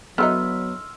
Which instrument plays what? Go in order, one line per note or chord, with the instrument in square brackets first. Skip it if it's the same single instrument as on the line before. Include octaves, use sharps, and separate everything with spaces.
[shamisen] D3 E3 D#4 [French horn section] F#3 [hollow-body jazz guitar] B3 [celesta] C6 E6 F6